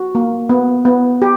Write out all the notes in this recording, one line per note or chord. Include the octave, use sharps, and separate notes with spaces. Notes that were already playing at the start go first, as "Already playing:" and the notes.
Already playing: F#4
A#3
B3
B3
G4